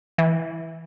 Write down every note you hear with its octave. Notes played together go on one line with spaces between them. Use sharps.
E3